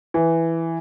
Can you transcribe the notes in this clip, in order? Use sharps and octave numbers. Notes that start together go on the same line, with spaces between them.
E3